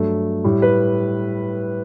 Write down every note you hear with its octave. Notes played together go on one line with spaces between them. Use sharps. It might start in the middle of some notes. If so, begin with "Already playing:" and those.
Already playing: G2 F#3 A3
A2 G3
B4